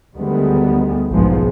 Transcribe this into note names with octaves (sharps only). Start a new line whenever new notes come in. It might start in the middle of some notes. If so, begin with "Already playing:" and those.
D2 D3 D#3 G3 G#3 B3
F#1 B1 G#2 F3 G#3 B3